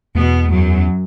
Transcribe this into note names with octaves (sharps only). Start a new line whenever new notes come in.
E2 B2 B3
F#2 F#3